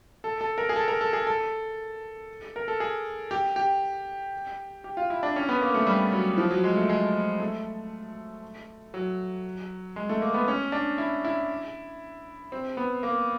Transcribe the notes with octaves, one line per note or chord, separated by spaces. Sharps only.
A4
A4
A#4
G#4
A4
A#4
A4
G#4
A4
A#4
A4
G#4
G4
G4
G4
F4
E4
D4
C#4
B3
A#3
A3
G3
F#3
F3
F#3
G#3
A3
G#3
A3
F#3
G#3
A3
A#3
B3
C#4
D4
E4
E4
C4
B3
A#3